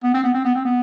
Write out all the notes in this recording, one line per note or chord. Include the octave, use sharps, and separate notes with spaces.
B3
C4
B3
C4
B3
C4
B3